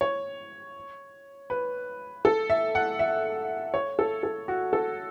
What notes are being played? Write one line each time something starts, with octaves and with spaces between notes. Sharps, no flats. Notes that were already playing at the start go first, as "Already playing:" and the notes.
C#5
B4
A4
E5
F#5
E5
C#5
A4
A4
F#4
A4